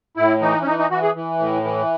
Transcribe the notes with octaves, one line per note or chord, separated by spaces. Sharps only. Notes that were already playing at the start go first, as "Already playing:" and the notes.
A2 E4
E3 D#4
C#4
E3 D#4
D#4
E3 F#4
G#4
E3
A2
E3